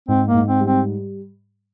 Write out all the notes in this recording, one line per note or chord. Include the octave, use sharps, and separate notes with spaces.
G#2 C4
A#3
G#2
C4
G3
C4